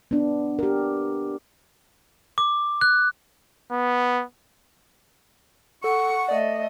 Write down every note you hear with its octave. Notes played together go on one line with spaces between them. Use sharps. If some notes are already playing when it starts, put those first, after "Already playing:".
B3 D4
G4 A#4
D6
F#6
B3
A4 F#5 C#6
A3 D5 D#5